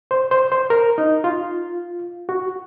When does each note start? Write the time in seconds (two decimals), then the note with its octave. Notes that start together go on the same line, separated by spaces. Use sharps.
0.11 C5
0.31 C5
0.52 C5
0.70 A#4
0.98 D#4
1.24 F4
2.29 F#4